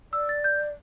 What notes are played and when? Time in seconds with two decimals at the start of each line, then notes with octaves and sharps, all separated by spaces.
0.13 D5 E6
0.29 A6
0.44 G6